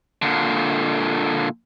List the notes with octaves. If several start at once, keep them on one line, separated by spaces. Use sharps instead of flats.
A#2 D3